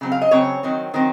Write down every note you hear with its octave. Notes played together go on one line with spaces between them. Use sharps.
C#3 F#3 C4
F5
D#5
C#3 F#3 C4 C#5
D#3 F#3 C4
D#3 F#3 C4